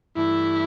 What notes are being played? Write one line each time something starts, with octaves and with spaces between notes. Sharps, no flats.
G2 E3 A3 E4